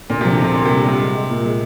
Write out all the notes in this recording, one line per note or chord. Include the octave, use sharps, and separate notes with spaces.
A#2 D3
C3 F3
D3
D#2 C3
A#2 A#3
C3 G3
D3
C3 G3
G#3
G#3
A#2
G#3